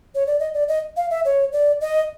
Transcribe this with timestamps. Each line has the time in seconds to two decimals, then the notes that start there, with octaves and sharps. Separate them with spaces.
0.15 C#5
0.27 D5
0.40 D#5
0.54 D5
0.68 D#5
0.97 F5
1.10 E5
1.25 C#5
1.52 D5
1.81 D#5